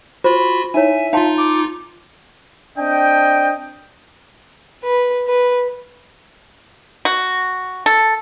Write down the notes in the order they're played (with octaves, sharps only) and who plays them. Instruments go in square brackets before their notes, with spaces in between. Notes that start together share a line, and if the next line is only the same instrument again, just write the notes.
[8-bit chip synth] F4 F#4 [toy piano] C5 [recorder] B5
[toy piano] D#4 E4 C#5 [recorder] E5 [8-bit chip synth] G#5
[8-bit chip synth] D#4 F4 [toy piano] F5 A5 C6
[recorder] D6
[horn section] C4 D4 D#5 G5
[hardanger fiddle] B4
B4
[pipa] F#4
A4